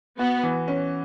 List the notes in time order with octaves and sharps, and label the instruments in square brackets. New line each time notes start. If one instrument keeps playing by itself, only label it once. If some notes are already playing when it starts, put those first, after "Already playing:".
[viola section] B3 [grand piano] F#4
[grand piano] E3
C#4